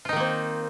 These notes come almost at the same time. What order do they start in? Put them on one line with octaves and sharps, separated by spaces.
F4 D#4 D#3 A#3 C4